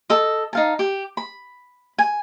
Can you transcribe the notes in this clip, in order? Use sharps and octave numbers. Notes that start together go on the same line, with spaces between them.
A4 D#5
D#4 F5 A5
G4
B5
G#5